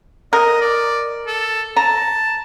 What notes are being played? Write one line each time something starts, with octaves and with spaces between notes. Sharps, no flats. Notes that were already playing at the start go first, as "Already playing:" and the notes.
A#4 D#5
D5
A4
A5 A#5